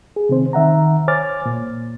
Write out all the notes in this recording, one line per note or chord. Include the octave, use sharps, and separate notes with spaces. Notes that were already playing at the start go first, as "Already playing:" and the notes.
G#4
C3 D#3 C4 C5
D#3 E5 F#5 A#5
C5 C#5 G#5 D6 F6 A6
A#2